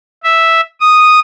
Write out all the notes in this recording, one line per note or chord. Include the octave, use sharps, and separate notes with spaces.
E5
D#6